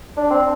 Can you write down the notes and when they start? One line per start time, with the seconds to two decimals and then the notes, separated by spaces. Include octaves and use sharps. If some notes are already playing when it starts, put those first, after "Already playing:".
0.17 D4
0.30 C4